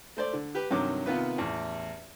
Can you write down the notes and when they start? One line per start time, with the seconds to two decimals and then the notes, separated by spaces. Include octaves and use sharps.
0.17 A3 C5 D5
0.33 D3
0.55 G4 B4
0.71 G2 C3 D#3 F#3 D6
1.06 C3 D#3 B3 F4 B4
1.38 A1 E2